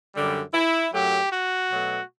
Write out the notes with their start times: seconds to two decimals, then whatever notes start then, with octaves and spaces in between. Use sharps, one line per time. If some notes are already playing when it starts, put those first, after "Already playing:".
0.15 F#2 D3 G3
0.54 E4
0.93 F#2 F#3 A3 G4
1.33 F#4
1.71 B2 F#3 A3